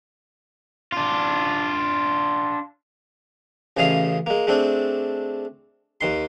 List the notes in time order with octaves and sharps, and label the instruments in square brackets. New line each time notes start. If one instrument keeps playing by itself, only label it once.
[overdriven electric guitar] D4 F4
[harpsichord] A1 A2 C#3 G#4 D#5 F5
G#3 A#3
G#3 A3 C4 D4
D#2 D#3 C6